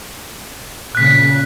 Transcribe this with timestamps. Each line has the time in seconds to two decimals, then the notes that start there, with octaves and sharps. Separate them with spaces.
0.95 A#2 C#3 F#6 B6